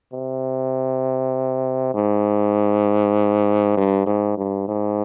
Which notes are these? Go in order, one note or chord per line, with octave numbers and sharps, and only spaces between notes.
C3
G#2
G2
G#2
G2
G#2